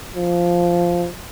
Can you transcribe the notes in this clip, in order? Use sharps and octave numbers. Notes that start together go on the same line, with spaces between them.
F3